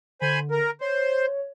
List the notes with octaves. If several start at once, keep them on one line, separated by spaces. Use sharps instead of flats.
D3 C5 G#5 B5
A#4
C5 C#5